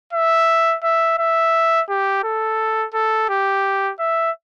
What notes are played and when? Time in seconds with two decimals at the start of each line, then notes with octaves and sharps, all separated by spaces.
0.13 E5
0.83 E5
1.18 E5
1.89 G4
2.24 A4
2.94 A4
3.29 G4
4.00 E5